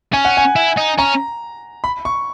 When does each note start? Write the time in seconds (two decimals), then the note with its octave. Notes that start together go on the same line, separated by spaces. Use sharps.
0.13 C#4 G#5
0.25 F#5
0.37 G#5
0.56 E4
0.77 D#4
0.98 C#4 A#5
1.84 B5
2.05 C#6